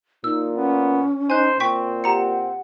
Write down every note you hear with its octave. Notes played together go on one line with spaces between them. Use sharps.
A#2 D#4 E6
B3 C#4
D#4 C5 G#5 F#6
A#2 C4 G5 C#6 B6
G4 F#5 A#5 C#7